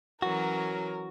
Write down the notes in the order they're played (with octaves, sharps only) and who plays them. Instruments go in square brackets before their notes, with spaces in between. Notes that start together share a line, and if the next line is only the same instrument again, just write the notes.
[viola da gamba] E3 F#3 C#4 [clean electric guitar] F#4 [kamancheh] A#4